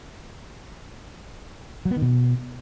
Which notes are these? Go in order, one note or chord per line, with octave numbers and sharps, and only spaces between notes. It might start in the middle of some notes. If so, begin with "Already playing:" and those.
F#3
B3
D#3
B2